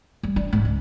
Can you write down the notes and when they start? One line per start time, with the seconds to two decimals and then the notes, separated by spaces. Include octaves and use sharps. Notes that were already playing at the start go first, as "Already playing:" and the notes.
0.23 G3
0.36 D4
0.53 G#2
0.65 C#2